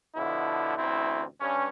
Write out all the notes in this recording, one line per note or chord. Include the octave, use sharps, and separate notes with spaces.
B2 D3 F3 E4
A1 D2 C4 E4
G2 C#4